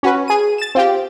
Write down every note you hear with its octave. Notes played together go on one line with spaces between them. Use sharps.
C#4 F#4 B4
G#4 D#7
A6 E7
C4 F4 G4